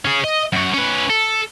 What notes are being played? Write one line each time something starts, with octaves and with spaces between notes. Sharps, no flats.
C#4 G#4
D#5
F#2 F#4
C#4 B4
A4